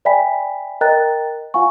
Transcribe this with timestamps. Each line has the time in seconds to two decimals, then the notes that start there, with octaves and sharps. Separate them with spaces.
0.05 D5 E5 G5 G#5 B5 B6
0.81 A#4 D#5 G5 A#5 F#6 A6
1.54 F4 F5 F#5 G#5 C#6